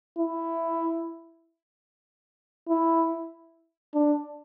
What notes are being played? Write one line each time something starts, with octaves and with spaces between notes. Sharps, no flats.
E4
E4
D4